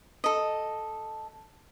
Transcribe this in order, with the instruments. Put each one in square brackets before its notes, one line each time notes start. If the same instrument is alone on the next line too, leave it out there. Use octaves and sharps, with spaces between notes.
[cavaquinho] A4 D#5